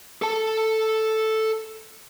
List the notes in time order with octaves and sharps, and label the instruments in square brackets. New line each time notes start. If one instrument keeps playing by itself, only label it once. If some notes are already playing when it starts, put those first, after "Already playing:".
[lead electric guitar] A4 A5